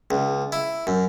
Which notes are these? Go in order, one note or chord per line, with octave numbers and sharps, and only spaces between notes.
C#2
E4
F#2